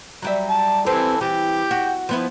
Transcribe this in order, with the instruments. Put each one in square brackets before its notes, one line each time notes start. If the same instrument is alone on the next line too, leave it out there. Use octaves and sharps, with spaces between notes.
[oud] F#3 G3 E5
[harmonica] A5
[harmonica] E3 A4 [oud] C4 G4 B4
[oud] E3 [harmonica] G4 G5
[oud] F#4
F3 B3 E4